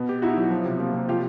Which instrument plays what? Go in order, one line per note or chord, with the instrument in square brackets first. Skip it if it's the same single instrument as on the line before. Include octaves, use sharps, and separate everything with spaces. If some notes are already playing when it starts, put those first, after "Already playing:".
Already playing: [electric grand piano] B2 B3
G4
[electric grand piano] D#4 [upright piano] E4 F#4
[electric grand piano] F#3
F3
C3
A#3
C3
[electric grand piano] F3 [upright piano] F4 G4